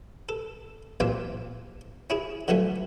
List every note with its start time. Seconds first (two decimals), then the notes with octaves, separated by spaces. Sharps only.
0.29 A4
1.00 A1 A#2 C4 D4 F4 G5
2.10 C#4 E4 G#4
2.48 D3 F3 F#3 A3 C#4